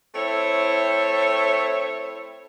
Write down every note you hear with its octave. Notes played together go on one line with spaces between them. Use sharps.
A3 C4 E4 C#5